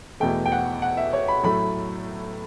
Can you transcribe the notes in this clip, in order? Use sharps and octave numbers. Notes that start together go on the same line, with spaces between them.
E2 B2 A3 G5
G5
F#5
F#5
E5
C#5
B5
A2 F#3 A3 B5